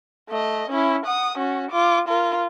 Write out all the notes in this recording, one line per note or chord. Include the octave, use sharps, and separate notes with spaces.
A3 D#5
C#4 E4
F#5 D#6
C#4 F#4
F4 D6
F4 A#4